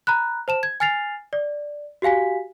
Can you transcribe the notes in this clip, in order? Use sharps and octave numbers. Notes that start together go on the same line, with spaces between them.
A#5 B5 F#6
C5 A5 E7
G#6
G#5 F6 A6 C7 F7
D5
F#4 G4 F5 G#5 B6